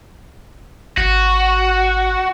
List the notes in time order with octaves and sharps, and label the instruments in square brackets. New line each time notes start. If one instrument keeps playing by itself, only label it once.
[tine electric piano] G#1 [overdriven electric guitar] F#4